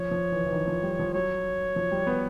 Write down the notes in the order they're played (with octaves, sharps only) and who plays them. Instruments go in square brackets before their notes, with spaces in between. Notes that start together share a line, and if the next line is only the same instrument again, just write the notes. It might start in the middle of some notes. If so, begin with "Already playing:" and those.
Already playing: [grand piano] F3 [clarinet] C#5
[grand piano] F3
E3
E3
D#3
F3
G3
F3
[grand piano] F#3 [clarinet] C#5
[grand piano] F3
G3
B3